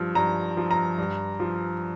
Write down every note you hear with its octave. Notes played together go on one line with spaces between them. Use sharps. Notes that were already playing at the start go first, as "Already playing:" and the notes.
Already playing: G2 F3
G2 A#5
F3
A#5
G2
F3